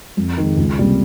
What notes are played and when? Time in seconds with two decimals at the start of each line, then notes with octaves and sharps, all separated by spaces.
0.17 F2
0.38 D#3 G#3
0.57 C#2
0.78 C3 G3 A#3